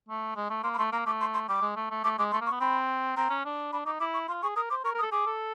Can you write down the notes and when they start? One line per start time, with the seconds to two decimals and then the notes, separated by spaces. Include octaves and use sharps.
0.09 A3
0.36 G#3
0.50 A3
0.63 A#3 C6
0.74 B5
0.78 A3 C6
0.92 A#3 A#5
1.06 A3 D6
1.21 C6
1.34 C6
1.49 G3 D6
1.61 G#3
1.76 A3
1.91 A3
2.04 A3 D6
2.19 G#3 D6
2.32 A3 C6
2.41 A#3
2.46 C#6
2.51 B3
2.60 C4 B5
3.17 C4 A#5
3.30 C#4
3.45 D4
3.73 D4 B5
3.86 D#4 D6
4.00 E4 D6
4.14 C#6
4.28 F4 C6
4.42 G#4 C#6
4.56 A#4 D#6
4.70 C5 D6
4.84 A#4 C#6
4.94 A#4 D#6
5.02 A4
5.12 G#4 D6
5.26 A4